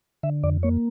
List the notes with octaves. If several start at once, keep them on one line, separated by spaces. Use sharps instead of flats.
D3 E5
F2 D5
A#3 C#5